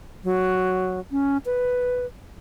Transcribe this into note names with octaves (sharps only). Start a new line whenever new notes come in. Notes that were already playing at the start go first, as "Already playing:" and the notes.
F#3
C#4
B4